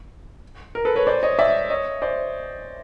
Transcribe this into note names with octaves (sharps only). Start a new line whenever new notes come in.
A#4
A4 B4
B4 C#5
C5 D5
C#5 D#5
D5 E5
C#5 D#5
C5 D5